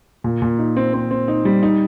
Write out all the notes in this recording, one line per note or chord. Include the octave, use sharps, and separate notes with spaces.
A#2
A#2
D#4
C4
C4
C4
D#4
G3
D#4